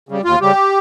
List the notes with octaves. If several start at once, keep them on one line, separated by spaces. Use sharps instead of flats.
C#3 G3
D#2 F4
C#3 G3 G4